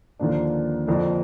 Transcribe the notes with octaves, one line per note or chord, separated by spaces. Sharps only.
D#2 D3 F3 A#3 D4
F2 D3 F3 A#3 D4